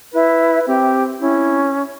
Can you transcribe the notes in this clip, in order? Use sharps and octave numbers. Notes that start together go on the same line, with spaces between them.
E4 B4
C4 G4
C#4 E4